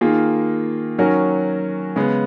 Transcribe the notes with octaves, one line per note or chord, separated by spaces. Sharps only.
D#3 A#3 F4 G#4
D#3 F#3 C#4 F#4 A#4
C#3 G#3 B3